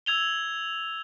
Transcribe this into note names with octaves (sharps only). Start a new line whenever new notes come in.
E6 G#6 F7 G7